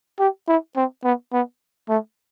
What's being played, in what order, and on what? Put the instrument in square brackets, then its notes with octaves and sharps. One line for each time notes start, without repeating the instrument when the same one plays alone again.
[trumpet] G4
E4
C4
B3
B3
A3